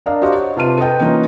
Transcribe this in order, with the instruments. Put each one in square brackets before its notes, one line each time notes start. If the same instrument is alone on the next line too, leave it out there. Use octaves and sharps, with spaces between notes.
[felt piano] D4 A#4 D5 D#5 F5 A#5
F#4 G4 C5 D#5 F5
C#5
C3 F4 B4 A5 F6 D#7
A4 B4 D#5 G5
E3 A#3 C#4 D#4 F4 B4